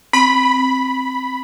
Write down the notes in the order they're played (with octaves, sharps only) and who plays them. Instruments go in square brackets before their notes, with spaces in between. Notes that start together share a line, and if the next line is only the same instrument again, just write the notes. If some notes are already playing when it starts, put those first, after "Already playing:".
[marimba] C4 [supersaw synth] B5